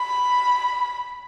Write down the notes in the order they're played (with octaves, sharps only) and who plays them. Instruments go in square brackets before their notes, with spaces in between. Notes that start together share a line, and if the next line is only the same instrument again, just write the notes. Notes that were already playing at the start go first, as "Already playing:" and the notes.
Already playing: [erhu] B5